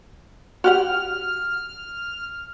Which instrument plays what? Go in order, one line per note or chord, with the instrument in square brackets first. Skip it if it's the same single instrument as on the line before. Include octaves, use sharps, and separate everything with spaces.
[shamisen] F#4 G4 F#5 [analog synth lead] F6